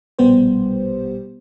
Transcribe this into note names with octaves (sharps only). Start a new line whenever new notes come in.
A#1 B2 G3 B3 G4 C5